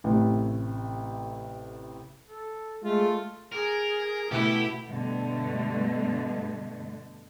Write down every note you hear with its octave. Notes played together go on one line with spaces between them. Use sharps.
A1 A2 C3
A4
G#3 A3 F4
G#4 A#4
B2 A3 E4 G4 E5 F#5
G2 B2 D3 A3